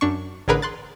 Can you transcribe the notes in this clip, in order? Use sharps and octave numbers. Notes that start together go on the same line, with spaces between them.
F#2 D4 C#6
A1 D3 G#4 A#4 B4 B5
C6 F#6 A6